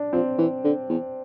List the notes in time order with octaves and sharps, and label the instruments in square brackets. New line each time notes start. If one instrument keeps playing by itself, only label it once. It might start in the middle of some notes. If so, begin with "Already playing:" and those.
Already playing: [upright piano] D4
[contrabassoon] F3 [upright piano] C4
[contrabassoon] E3
D3
E2